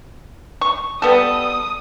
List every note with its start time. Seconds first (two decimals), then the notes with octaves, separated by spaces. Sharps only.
0.61 C#6
1.02 G3 B3 A4 D#6